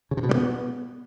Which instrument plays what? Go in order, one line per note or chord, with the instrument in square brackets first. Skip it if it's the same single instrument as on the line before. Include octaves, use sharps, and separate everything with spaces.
[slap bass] C#3
C3
B2
G3
B3